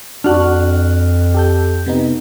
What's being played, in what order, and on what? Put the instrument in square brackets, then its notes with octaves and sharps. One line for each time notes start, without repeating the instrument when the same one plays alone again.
[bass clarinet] F2 [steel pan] D4 F#4 [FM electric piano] F6 F#6
[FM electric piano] G4 A4 G6
C3 B3 D#4